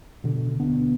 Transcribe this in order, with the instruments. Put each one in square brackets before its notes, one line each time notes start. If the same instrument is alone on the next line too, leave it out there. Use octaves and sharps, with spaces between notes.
[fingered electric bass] B2 D3
D2 B2 B3 D4